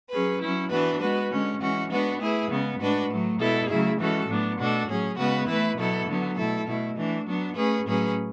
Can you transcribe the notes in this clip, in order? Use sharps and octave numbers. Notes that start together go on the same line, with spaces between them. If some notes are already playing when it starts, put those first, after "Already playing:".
F#3 C#4 G#4 B4
F#3 C#4 E4
E3 B3 D4 F#4 B4
G#3 B3 F#4 B4
D3 G#3 C#4
E3 G#3 C#4 F#4
G#3 B3 D4 F#4 B4
A3 E4 G#4 B4
C#3 G#3 B3
A2 G#3 D4 F#4 B4
A2 F#3 A3
B2 G#3 B3 E4 A4
C#3 F#3 A3 E4 G#4
E3 G#3 C#4 F#4 A4
A2 F#3 B3 D4
B2 A3 D4 F#4 A4
A2 F#3 C#4 G#4
C#3 G#3 B3 F#4 B4
E3 A3 E4 B4
B2 F#3 B3 E4 A4
D3 F#3 B3
B2 A3 E4 A4
B2 A3 E4
E3 A3 D4
F#3 B3 D4
A3 C#4 G#4 B4
A2 F#3 C#4 G#4 B4